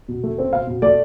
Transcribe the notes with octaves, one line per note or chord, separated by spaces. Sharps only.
B2
A3
C4
B2 F5
B2
A3 D5